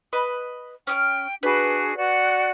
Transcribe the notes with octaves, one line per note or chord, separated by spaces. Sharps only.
B4 D#5
C#4 G5 D#6 F6
D4 F#4 G#4 B4
F#4 D5 F#5